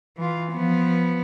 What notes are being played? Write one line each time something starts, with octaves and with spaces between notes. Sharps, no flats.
E3 F4
F3 B3